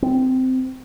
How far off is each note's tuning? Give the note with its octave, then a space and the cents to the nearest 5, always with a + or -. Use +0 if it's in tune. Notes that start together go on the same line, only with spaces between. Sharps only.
C4 -15